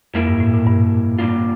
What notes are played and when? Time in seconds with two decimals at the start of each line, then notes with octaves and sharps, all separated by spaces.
0.14 F2 G3 A#3 E4 A#4 E5
0.27 G2
0.40 A2
0.54 A#2
0.67 G2
1.18 D3 G3 A#3 D4 F4